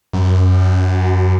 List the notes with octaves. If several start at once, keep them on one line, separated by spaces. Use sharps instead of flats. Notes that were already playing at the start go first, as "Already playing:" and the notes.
F#2